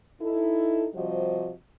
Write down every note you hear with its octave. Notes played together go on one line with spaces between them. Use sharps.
D#4 E4 A4
C3 F3 G3 F#4 C5 D#5